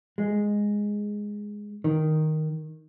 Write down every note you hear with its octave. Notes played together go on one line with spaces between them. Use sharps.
G#3
D#3